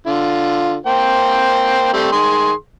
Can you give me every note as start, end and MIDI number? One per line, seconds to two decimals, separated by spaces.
0.07 0.77 50
0.07 0.77 65
0.86 1.91 58
0.86 1.91 72
0.86 1.91 79
1.93 2.11 55
1.93 2.11 57
1.93 2.11 60
2.12 2.52 51
2.12 2.52 68
2.12 2.52 84